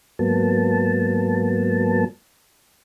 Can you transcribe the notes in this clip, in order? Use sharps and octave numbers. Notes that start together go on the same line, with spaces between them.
G#2 F#3 A#3 B3 A5